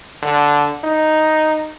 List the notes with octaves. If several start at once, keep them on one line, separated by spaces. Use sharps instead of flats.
D3
D#4